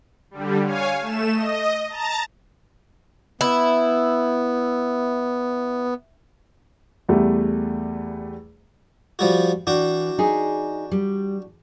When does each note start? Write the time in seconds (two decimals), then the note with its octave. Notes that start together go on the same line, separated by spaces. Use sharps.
0.31 D3 G3
0.65 C#5 F5 G#5
1.01 A3 E7
1.32 D#5
1.89 A5 A#5 A6
3.41 B3 E4
7.09 E2 G3 A3
9.19 F3 G3 F#4
9.67 E3 D4 F#4 G5
10.18 D#4 G#4
10.92 G3